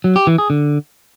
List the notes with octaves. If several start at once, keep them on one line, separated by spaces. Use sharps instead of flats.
F#3
G4
E3
G#4
D3